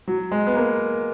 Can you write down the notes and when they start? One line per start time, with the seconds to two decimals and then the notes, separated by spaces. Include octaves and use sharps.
0.08 F#3
0.32 G#3
0.47 B3
0.55 A#3